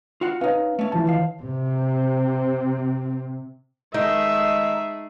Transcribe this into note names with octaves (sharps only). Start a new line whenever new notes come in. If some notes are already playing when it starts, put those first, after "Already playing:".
F4 F#4 F#5
C#4 D#4 B4 C#5 F5
A3 C#4
D2 E3 F3 A5
D#3 F5
C3 C4
D#3 G#3 A3 D#4 G#4 D#5 E5